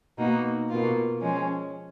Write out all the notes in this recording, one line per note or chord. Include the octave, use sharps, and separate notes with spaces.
B2 A#3 D#4 F#4
B2 A#3 F4
F3 G#3 C#4